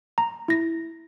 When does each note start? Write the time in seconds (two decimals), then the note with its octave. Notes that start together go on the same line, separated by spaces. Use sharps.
0.18 A#5
0.48 E4 A#6